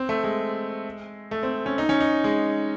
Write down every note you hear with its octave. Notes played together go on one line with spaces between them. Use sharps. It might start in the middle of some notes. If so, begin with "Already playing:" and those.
Already playing: C4
A3
G#3
A3
C4
C#4
D#4
C#4
D#4
G#3